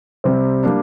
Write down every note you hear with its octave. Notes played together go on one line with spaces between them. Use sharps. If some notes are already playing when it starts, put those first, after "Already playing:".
C3 G3 C4
G3 A#3 D4